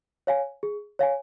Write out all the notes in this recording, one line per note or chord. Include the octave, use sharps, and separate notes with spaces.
C#5 F5 G#5
G#4
C#5 F5 G#5